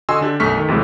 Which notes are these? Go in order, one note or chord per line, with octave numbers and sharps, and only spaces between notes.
D3 F#4 D#5 G#5 C6 E6
D3 D4 G4
B1 F#2 A3 C#6 F6 B6
D#3 A4
D#2 C3 E3 F#3 G#3 A3